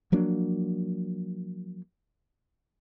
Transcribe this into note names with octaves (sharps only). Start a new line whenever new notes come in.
F3 F#3 A#3 D4